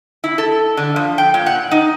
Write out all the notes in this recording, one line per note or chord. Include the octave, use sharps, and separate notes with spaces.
E4
A4
D3
F3
G5
A#2
F#5
D#4